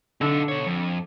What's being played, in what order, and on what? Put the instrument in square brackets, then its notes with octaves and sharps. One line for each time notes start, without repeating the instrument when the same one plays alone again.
[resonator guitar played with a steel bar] D3 [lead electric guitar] D#4 A4
[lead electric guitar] B2 C#5
F2